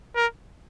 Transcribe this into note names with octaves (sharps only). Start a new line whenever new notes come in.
A#4